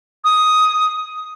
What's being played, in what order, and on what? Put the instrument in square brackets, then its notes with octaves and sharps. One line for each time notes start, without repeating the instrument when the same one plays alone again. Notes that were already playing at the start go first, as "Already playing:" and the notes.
[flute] D#6